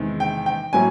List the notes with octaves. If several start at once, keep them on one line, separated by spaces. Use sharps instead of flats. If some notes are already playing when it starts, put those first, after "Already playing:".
Already playing: E2 C3 D#3 G#3
G5
G5
A2 F#3 A#3 C#4 G#5